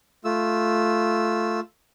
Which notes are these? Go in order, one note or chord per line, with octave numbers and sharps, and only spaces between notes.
A3 F4 E6